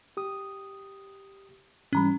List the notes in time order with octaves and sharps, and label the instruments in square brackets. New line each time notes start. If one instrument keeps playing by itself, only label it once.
[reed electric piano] G4 D#6
[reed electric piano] G#2 E3 G3 [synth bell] C#4 A#5 B5